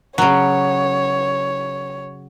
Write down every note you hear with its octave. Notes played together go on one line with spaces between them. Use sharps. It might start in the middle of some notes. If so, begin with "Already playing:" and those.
C#3 F#3 C#5